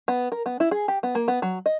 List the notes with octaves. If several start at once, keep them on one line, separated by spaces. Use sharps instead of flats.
B3
A#4
B3
E4
G#4
G4
B3
A#3
B3
F#3
D#5